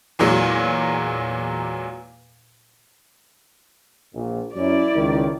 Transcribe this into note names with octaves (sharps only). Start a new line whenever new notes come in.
E2 A#2 F#3 G#3
A#1 A#2
F#2 E4 D5
C#2 D#3